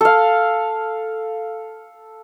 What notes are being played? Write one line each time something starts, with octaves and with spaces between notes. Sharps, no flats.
A4 F5